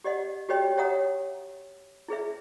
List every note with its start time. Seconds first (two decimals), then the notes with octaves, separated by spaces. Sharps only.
0.04 G4 D5 D#5 F#5
0.49 F#4 G4 B4 C#5 D#5 G5
0.77 G4 C#5 E5 F#5 A#5 D#6
2.08 E4 G#4 B4 E5